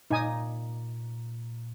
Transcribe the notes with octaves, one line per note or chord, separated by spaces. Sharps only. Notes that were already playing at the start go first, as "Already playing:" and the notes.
A#2 D#4 G#5 D#6